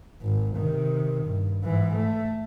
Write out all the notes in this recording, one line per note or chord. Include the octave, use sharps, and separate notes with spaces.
G#1
C3 D#3
G2
G#2 E3
A3